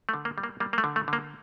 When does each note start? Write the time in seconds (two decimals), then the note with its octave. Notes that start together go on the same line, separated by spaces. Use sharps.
0.09 A3
0.14 D3
0.25 A#3
0.38 G3
0.43 A#3
0.60 G3 A#3
0.73 A#3
0.78 A3
0.84 D3
0.96 A3
1.08 D3 A#3